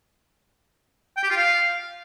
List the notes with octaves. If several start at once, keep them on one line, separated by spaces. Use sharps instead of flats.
G5
G4
F4
F5